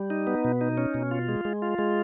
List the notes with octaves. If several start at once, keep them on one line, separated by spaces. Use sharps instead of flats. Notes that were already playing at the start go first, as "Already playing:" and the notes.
Already playing: G3
D#4
B3
B2
D#4
C#4
B2
F4
G#3
G#3
F4
G#3